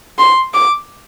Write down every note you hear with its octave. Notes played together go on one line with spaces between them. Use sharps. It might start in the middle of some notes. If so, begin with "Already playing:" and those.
C6
D6